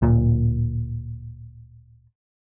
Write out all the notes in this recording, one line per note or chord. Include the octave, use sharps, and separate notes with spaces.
D1 A#2